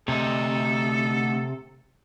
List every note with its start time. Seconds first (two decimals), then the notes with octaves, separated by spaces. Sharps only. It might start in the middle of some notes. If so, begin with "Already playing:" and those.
0.08 D2 C3 D#4 A4